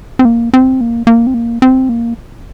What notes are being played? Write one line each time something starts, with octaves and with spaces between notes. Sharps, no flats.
C4
A#3
C4
A#3
A#3
C4
A#3
C4
A#3